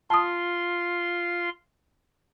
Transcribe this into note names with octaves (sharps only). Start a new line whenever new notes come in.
F4 A5 C6 D#6